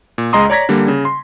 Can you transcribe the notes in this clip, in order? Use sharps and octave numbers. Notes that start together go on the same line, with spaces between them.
A#2
C#2 G#3 D#5 A#5 C6 D#6
C#5 D5 A#5 G#6 A#6 B6
D3 G3 A#3
C#3
C6